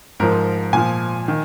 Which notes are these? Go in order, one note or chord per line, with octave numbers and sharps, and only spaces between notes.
G#2 F3 A#4
A#2 F3 G#5
D#3